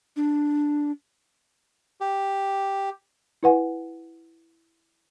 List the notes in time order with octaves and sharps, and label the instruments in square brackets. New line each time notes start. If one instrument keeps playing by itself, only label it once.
[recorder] D4
[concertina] G4
[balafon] E4 B4 F#5 G#5